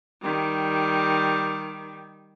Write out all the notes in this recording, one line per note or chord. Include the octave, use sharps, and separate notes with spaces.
D#3 G3